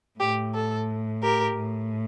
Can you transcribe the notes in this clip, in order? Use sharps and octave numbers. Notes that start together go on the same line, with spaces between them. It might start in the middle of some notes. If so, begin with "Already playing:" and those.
A2 G4
A4
G4 A#4
A2